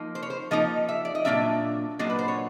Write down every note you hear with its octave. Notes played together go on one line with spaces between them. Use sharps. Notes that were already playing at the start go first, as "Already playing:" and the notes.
Already playing: F3 A#3 D#4
C5
C#5
C5
F3 A#3 D#4 D#5
E5
D5
D#5
A#2 F#3 A#3 D4 E5
A#2 F#3 A#3 D4 D#5
B4
C5
C#5